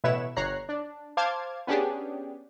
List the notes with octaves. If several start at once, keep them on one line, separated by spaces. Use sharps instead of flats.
A1 B2 E4 B4 C#5 E7
G1 C#5 A#5 F#6 C7
D4
C5 F5 A5 D6 F6 G#6
B3 C#4 D4 G4 G#4